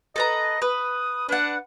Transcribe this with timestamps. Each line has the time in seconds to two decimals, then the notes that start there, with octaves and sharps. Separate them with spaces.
0.16 A4 B4 D#5 A#5
0.62 B4 D#6
1.29 D4 B4 F#5